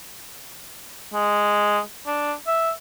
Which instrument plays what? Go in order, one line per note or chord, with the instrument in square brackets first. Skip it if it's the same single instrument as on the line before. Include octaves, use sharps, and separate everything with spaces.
[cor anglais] G#3
D4
E5